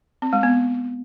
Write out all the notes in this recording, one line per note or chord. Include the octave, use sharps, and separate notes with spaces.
C4
G#3
B3